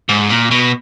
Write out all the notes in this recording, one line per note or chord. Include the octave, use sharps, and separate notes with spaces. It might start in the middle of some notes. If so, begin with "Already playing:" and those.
G#2
A#2
B2